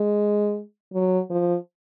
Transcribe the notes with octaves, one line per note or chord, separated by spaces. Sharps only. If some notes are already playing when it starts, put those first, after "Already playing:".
Already playing: G#3
F#3
F3